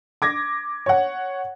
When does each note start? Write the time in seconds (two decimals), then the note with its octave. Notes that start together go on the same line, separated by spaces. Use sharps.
0.22 D6 G#6 A#6
0.86 C#5 F#5